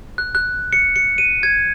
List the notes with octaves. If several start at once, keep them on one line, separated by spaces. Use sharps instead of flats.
F#6
F#6
C#7
C#7
D#7
G#6